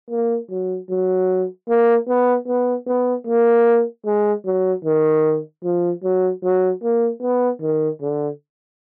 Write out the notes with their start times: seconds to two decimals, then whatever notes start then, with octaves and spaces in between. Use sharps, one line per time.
0.11 A#3
0.50 F#3
0.90 F#3
1.68 A#3
2.08 B3
2.47 B3
2.87 B3
3.27 A#3
4.05 G#3
4.45 F#3
4.84 D#3
5.64 F3
6.03 F#3
6.43 F#3
6.83 A#3
7.22 B3
7.61 D#3
8.01 D3